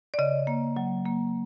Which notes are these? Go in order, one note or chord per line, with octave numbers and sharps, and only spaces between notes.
D5
C#3 D#5
A#3
F#3
A#3